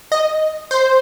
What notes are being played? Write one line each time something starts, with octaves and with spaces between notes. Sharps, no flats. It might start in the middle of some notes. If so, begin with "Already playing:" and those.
D#5
C5